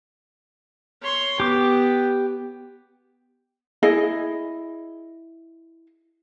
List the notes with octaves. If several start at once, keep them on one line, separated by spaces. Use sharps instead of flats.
C#5 C6
B3 G4 D6
E4 G#4 D#5